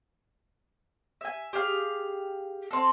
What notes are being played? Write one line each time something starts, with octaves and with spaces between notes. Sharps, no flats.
E5 G#5
G4 G#4 F5
C4 A4